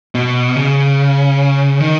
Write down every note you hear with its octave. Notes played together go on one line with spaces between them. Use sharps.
B2
C#3
D#3